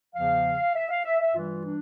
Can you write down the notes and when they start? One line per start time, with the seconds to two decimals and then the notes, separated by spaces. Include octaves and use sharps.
0.15 E2 C#3 F3 F5
0.75 E5
0.90 F5
1.05 E5
1.20 E5
1.35 G2 E3 G3 F4
1.65 D4